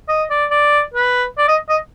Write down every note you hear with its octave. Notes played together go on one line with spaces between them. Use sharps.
D#5
D5
D5
B4
D5
D#5
D#5